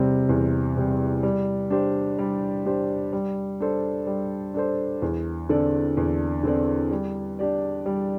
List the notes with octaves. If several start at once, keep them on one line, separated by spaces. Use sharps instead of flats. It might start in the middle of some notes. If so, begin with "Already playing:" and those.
Already playing: E2 C3 G3 C4
E2
C3 G3 C4
G3
D4 G4 C5
G3
D4 G4 C5
G3
D4 A4 C5
G3
D4 A4 C5
E2
D3 C4 A4 D5
E2
D3 C4 A4 D5
G3
D4 G4 D5
G3